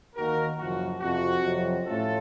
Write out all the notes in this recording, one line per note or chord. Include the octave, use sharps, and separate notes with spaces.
D#2 D#3 A#3 F#4 A#4
F#1 F#2 F3 F#4
F2 C3 F3 F#4
F2 C3 F#3
A2 A3 C#4 F4 A4